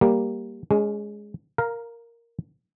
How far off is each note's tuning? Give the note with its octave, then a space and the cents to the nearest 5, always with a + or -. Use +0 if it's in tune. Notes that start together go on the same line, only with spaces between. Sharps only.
G3 +0 A#3 +0
G#3 +0 C#4 +30
A#4 +0 F5 +0 A#5 +25